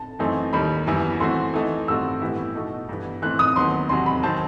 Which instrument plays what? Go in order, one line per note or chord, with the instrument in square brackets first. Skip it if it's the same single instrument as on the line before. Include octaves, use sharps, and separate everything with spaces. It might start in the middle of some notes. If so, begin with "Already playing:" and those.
Already playing: [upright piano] A5
[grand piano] F#2 E3 A3 C4 D#4
[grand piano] D#2 D#3 G3 [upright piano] B5
[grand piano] F#2 E3 G3 B3 E4
[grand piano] E3 A3 C4 F#4 [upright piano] C6
[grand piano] E3 A3 D#4
[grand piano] G2 D#3 A3 C4 F#4 [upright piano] E6
[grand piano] A2 E3 B3 E4 G4
B2 A3 D#4 F#4 A4
G2 E3 B3
[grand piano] E3 A3 C4 [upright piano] F#6
[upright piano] D#6
[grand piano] D#2 D#3 F#3 B3 [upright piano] C6
[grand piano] E2 C3 F#3 [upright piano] C6
[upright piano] B5
[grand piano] D#3 F#3 C4 [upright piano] A5